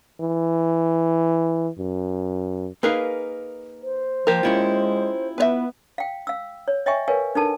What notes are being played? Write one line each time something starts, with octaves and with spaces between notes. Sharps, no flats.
E3
F#2
A#3 D#4 G#4 A#4 B4 F5
C5
F3 A#3 G4 A#4
G#3 C#4 E4 F4
B3 B4 C#5 E5
F5 G5
F5 E6
C#5
C#5 D#5 E5 G5 G#5 C#6
A#4 B4 C#5 F5 G#5
D4 D#4 A4 A#4 A5